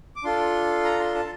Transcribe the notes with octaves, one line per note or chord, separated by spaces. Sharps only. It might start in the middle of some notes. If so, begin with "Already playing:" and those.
D6
D4 F4 A4 C6
A#5
C6
A5